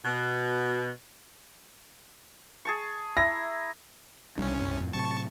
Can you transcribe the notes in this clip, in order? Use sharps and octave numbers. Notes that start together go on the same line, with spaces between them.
B2
G#4 A5 C#6
E4 A#5 A#6
C2 G3 C#4 D4
F#2
F2 A2
A2 C3 F#3 A5 C#6